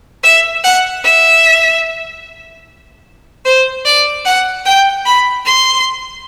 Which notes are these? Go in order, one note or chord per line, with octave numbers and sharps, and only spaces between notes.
E5
F#5
E5
C5
D5
F#5
G5
B5
C6